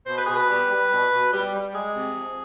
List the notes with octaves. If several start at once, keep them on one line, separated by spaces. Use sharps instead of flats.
B2 C5
B4
B2 G#4
B4
G3
G3
B2
B2
G3
G3
G#3 G#4
C3
F3